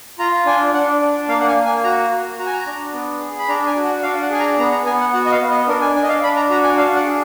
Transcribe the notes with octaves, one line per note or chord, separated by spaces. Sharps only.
F4 A#5
D4 G#5
D4 F#5
D4
A#3 F5
F#5
G#5
A#3
G#5
F#4 A#5
F#4
F#4 A#5
G#5
A#5
D4
B3
G#4
B5
D4 A#5
G#5
F#4
F#5
D4 F5
F#5
G#4 G#5
A#5
B3 A#5
A#5
B3 G#5
F#5
F#4 F#5
D#5
F5
B3
D#5
D4 A#4
G#5
D4 G#5
D#5
F5
D4 B5
A#5
F#4 A#5
G#5
D4 F5
F#5
G#4